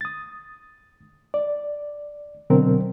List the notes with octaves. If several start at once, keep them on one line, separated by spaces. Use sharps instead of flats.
D#6 A6
D5
B2 D3 F#3 C4 A#4